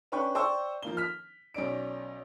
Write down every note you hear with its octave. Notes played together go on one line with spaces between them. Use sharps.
C#4 D4 B4 G5 C#6
C5 D5 G5 C#6 E6
F3 A#3 G7
F6 B6
B1 C#4 D5 D7